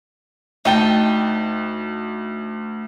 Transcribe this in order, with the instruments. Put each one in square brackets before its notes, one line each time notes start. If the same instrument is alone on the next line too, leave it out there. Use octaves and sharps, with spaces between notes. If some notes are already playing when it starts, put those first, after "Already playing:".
[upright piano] D2 G7 [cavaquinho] D#4 G5 A5